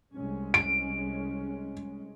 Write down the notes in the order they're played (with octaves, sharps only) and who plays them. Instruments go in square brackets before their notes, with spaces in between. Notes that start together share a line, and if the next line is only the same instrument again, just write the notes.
[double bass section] C2 G#3 C#4
[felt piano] D7